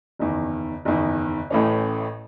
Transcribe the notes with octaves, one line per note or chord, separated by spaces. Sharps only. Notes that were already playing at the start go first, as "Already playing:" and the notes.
F#1 E2 D#3
F#1 E2 D#3
A1 A2 E3 A3 C#4